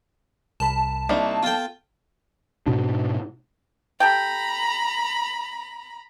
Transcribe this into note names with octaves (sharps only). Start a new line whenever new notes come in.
C2 A#4 A5 B5
C2 A#3 D4 D#4 B5
B3 F4 A4 G5
G#2 B2 D4
G4 A4 G5 A#5 B5